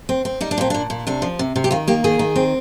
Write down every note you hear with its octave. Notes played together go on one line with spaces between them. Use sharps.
C4
C4
G3 D#4
D4
A#2 C4
A#2 D4
A#2
C3 D4
F3
C3
C3
G4
D#3 F4
A#3 G4
D#3 G#4
D#3
C4